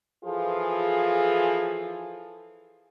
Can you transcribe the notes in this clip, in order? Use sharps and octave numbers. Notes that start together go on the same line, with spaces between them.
E3 F3 F4 G#4 A4